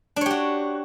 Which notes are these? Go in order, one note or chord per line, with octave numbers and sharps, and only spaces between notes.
D4 F#4 G4 C#5